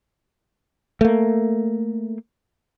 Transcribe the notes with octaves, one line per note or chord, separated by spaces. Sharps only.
A3 A#3